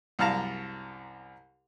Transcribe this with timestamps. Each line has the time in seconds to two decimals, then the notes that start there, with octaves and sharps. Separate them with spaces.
0.19 C2 F#2 F5 A5 A#5